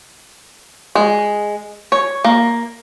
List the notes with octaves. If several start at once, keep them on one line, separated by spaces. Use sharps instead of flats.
G#3
C#5
A#3